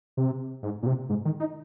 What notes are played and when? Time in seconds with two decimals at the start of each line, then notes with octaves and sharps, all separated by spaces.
0.17 C3
0.63 G#2
0.83 A#2
0.86 C3
1.09 G#2
1.25 D#3
1.40 D#4